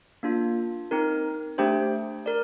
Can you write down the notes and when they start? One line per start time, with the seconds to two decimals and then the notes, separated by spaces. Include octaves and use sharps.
0.23 A#3 D4 F4
0.91 C4 D#4 A#4
1.58 A3 D4 G4 C5 G5
2.26 A#4 D5